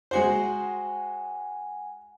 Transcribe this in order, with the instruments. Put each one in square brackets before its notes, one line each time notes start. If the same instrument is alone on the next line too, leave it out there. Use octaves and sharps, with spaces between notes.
[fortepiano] G#3 F#4 C5 [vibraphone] F#5 G#5